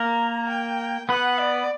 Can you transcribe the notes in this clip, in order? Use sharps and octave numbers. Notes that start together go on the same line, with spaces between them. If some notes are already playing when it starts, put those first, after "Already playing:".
Already playing: A#3 A#4 A#5
G5
B3 B4 F#5
D5